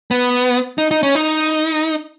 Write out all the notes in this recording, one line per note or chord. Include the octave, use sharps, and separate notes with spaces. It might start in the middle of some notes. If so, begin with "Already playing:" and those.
B3
D#4
D#4
C#4
D#4